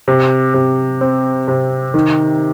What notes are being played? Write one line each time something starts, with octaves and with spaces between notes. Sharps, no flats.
C3
C3
C4
C3
D#3